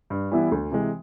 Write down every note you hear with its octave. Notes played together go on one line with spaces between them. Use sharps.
G2
E3 G3 B3 E4
D2
C3 E3 G#3